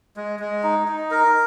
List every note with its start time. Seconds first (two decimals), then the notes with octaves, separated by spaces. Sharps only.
0.17 G#3
0.40 G#3
0.63 D#4
0.88 D#4
1.11 A#4